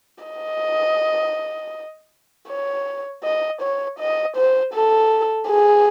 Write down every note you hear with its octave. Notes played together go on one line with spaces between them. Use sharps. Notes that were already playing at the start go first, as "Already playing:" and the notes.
D#5
C#5
D#5
C#5
D#5
C5
A4
G#4